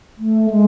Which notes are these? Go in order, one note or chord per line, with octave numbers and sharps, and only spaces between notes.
A3
G#3